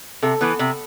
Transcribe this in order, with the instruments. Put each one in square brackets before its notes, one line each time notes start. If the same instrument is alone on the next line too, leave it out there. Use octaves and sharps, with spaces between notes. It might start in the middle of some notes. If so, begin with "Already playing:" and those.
[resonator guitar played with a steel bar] C3 [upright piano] A4
[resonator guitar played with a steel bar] E3 B3
C3